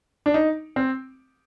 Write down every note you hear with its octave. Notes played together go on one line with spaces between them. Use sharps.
D4
D#4
C4